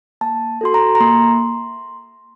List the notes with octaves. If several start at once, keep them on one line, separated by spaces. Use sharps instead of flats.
A#3 A5
F#4 A4 C6
A#5
A#5
A#3 C6